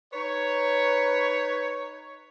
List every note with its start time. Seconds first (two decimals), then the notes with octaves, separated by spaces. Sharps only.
0.13 D#4 B4 C#5